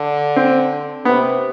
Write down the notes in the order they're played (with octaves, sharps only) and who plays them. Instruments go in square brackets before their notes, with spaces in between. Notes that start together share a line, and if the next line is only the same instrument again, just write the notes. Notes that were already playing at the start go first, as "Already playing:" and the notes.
Already playing: [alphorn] D3
[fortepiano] C4
[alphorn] C3 [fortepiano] B3